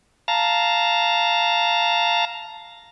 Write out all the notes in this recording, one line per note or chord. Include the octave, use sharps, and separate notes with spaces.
F5 A5 A#5